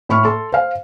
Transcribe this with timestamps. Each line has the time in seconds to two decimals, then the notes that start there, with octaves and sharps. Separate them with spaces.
0.09 A2 B5 C#6 F6
0.24 A4 C6
0.52 C5 F5